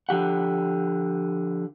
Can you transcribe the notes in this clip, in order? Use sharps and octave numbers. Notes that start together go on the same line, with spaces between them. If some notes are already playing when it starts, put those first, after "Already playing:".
D3 F3 G4 F#5